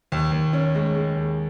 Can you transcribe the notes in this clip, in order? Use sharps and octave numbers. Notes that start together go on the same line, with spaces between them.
D#2
D#2
C#4
G#3
G#3
D#2